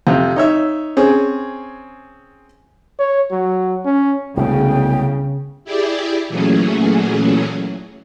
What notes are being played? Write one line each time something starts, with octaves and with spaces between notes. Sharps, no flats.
F2 C3
D#4 C#5 E5
C4 C#4 G#4
C#5
F#3
C#4
E1 C2 C#3 A3 G5
E4 G4 G#4 D5
A#2 E3 F#3 A3 C#4 G#4